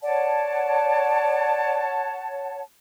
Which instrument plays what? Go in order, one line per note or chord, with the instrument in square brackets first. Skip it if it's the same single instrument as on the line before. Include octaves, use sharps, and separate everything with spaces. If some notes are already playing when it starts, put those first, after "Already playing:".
[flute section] C#5 F#5 A5 [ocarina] D5